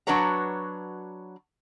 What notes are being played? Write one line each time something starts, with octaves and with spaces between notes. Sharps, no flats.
F#3 D4 F#4 B4 C#5 A#5